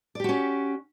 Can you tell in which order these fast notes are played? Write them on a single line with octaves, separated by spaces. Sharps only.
D5 G4 F#4 C#4